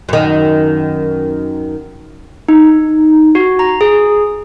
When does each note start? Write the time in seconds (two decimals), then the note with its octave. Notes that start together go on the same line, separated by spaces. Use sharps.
0.09 F#2 D#3
2.49 D#4
3.35 F#4
3.59 A#5
3.81 G#4